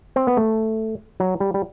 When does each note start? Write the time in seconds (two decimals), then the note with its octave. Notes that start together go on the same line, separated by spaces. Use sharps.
0.16 C4
0.27 B3
0.37 A3
1.20 F#3
1.40 G3
1.54 G3